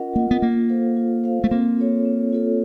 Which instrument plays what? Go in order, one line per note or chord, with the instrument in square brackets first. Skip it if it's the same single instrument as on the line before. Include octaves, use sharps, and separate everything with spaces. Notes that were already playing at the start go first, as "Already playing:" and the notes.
Already playing: [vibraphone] C#4 F4 A#4 D#5 F#5
[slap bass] A#3 [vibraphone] F4 A#4 D#5 F#5
[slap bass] B3
[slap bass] A#3 [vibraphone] F4
[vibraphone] A4 C5 F5
F4
A4 C5 F5
[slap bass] A3
[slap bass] A#3 [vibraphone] C4
[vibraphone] F4 A4 C#5
C4
F4 A4 C#5